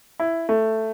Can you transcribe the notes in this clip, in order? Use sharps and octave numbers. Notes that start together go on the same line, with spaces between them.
E4
A3